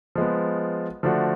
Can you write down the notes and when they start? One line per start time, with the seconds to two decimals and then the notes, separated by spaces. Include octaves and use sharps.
0.15 F3 G#3 B3
1.03 D3 F3 A3 D4 F#4